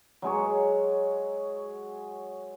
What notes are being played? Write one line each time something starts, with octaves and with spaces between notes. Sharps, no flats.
F#3 G#3 G#4 C#5